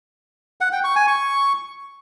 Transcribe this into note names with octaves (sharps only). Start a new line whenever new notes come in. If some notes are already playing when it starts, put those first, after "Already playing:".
F#5
G5
C#6
G#5
C#6